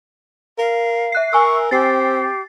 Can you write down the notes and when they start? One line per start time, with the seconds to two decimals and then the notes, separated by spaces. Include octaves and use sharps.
0.58 A#4 F5
1.12 E5 F#6 C7
1.33 A#4 G#5 C#6 E6
1.71 C4 G4 A6 C7